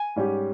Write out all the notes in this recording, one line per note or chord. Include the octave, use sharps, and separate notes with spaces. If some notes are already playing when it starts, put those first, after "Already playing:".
Already playing: G#5
G#2 G3 C#4 G4